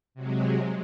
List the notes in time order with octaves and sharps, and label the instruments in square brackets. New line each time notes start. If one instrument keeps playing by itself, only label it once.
[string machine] C3 F#3 G#3